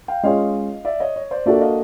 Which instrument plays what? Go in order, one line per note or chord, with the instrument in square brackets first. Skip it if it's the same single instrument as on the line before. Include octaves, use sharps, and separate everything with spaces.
[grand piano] F5 G5
[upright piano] G#3 C#4 F4 G#4 C#5 [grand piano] D#5 F5
[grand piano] D5 E5
C#5 D#5
C#5
C5 D5
[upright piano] A#3 D4 F#4 A4 [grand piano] D5 E5
[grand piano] D#5 F5